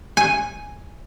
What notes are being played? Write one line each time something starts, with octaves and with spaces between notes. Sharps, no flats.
G#5